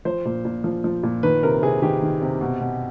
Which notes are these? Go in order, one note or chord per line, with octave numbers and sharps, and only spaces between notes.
F3 C5
A#2
A#2
F3
F3
A#2
D#3 B4
C3 A#4
C3 G#4
D#3 G4
D#3
C3
B2
B2